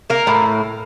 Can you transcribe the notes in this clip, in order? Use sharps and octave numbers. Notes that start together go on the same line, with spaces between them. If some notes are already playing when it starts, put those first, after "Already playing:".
A#3 A#4
A2